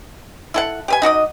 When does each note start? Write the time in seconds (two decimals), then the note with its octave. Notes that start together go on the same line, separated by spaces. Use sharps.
0.54 E4 A4 F#5
0.88 G4 B4 G#5
1.02 D#4 F#4 D5 D#5